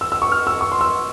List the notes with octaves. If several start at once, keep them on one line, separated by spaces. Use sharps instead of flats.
E6
E6
C#6
F6
E6
C#6
C6
E6